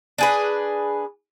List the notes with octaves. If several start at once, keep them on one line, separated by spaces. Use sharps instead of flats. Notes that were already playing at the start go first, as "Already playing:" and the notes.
D4 G#4 B4